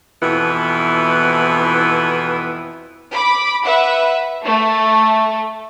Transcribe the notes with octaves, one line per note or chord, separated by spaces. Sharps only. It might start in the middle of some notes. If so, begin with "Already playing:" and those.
F2 B2 E3 B3 E4
B5 D6
B4 E5 F#5
A3